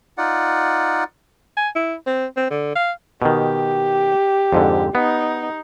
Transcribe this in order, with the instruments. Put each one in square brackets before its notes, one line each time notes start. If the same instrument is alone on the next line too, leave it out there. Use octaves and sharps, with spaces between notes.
[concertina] D#4 F4 D5 F#5
[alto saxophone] G#5
E4
C4
C4
D3
F5
[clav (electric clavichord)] B2 D#3 [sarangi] G4
[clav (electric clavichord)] F2 G#2 D3
[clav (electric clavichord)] B3 [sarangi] D#4